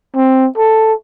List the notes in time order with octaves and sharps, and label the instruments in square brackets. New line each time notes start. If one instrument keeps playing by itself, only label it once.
[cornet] C4
A4